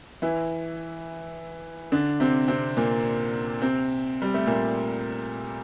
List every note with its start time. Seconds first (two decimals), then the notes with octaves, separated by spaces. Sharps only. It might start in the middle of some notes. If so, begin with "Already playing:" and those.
0.22 E3 E4
1.92 D3 D4
2.20 C3 C4
2.48 C3 C4
2.77 A#2 A#3
3.62 C3 C4
4.22 G3
4.34 A3
4.46 A#2 A#3